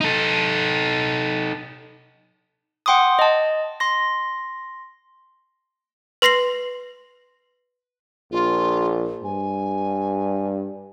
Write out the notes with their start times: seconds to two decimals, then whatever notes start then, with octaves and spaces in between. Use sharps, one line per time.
0.01 D#4 A4
2.86 F#5 G5 C6 D6 D#6
3.19 D#5 A5
3.80 C6 A#6
6.22 B4 C6 A#6 C7 F#7
8.31 A#1 F4
9.24 G2 G#5